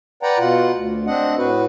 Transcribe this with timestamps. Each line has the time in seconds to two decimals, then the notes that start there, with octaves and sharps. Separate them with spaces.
0.23 B4 D5 F#5 G5 A#5
0.39 B2 F4 F#5
0.74 D2
1.07 C4 D4 D#5 F#5
1.38 A2 F#4 B4